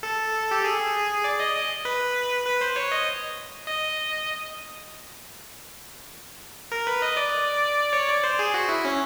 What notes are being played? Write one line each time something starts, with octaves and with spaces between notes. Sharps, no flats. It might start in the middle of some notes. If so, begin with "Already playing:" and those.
A4
G4
G#4
D5
D#5
D#5
B4
B4
C5
C#5
D#5
D#5
A#4
B4
D#5
D5
C#5
D5
C5
G#4
F#4
E4
C#4